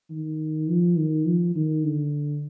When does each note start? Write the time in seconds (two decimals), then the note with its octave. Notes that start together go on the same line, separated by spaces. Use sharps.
0.10 D#3
0.68 F3
0.97 D#3
1.26 F3
1.55 D#3
1.84 D3